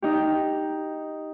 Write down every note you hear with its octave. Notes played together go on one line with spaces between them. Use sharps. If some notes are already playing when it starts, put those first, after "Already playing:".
D#4 G4